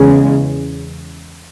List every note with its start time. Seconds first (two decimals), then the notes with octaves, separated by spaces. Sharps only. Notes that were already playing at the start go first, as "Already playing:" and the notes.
Already playing: E2 C#3 G#3